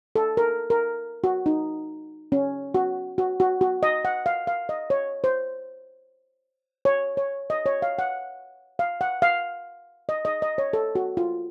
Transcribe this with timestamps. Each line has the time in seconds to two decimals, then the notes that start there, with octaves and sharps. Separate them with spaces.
0.16 A4
0.37 A#4
0.70 A#4
1.24 F#4
1.46 D#4
2.32 C#4
2.74 F#4
3.18 F#4
3.40 F#4
3.61 F#4
3.83 D#5
4.05 F#5
4.26 F5
4.47 F5
4.69 D#5
4.90 C#5
5.24 C5
6.85 C#5
7.17 C#5
7.50 D#5
7.66 C#5
7.82 F5
7.99 F#5
8.79 F5
9.01 F#5
9.22 F5
10.09 D#5
10.25 D#5
10.42 D#5
10.58 C#5
10.73 A4
10.95 F#4
11.17 F4